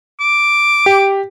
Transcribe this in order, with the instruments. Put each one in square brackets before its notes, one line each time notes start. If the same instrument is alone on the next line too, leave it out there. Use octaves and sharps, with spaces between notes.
[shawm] D6
[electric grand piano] G4